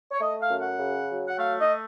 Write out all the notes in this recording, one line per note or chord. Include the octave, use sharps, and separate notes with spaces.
C#5
A3 D#5
F5
F#2
F#5
C#3
F#3
F#5
A3 F5
D#5